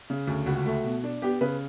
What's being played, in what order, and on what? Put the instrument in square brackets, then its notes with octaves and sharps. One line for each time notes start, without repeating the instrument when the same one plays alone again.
[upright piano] C#3
D2
C#2 F#4
A3
B2
D4
B3 G4
C#3 B4